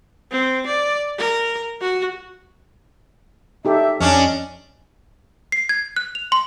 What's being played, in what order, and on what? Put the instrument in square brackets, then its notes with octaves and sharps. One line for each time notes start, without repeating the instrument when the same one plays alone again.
[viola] C4
D5
A#4
F#4
[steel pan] D#4 G4 A4 [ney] E5
[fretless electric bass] F2 [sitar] C#4 D4 [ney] D#5
[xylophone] C7
G#6
F#6
F7
C6